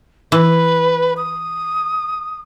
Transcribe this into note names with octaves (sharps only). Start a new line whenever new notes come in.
E3 B4
D#6